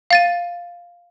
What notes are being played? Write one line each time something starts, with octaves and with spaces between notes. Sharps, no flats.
F5 A6 D#7